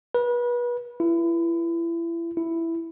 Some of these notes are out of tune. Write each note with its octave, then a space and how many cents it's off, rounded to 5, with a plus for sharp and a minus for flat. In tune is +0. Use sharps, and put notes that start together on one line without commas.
B4 -30
E4 +30
E4 +5